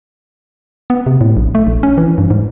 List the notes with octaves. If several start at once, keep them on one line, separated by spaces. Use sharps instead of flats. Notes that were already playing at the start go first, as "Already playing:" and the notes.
B3
C3
A2
A#1
A3
A#1
C#4
E3
G2
G#2